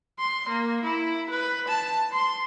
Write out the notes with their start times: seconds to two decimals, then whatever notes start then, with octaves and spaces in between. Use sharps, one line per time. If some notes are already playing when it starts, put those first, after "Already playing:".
0.19 C6
0.49 A#3
0.84 E4
1.30 B4
1.68 A5
2.12 C6